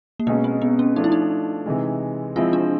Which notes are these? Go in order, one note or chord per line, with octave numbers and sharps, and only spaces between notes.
A#3
B2 G#3 B3 C#4
C4
B3
C#4
F3 A3 D4 D#4
E4
D#4
C3 E3 G#3
F3 G#3 C4 E4 F4
D4